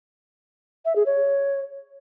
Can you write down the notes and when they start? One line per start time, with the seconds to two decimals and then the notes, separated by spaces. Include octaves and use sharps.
0.85 E5
0.96 G#4
1.06 C#5